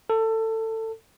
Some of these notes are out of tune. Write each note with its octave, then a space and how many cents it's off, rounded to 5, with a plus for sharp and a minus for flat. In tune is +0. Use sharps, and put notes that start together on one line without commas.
A4 +20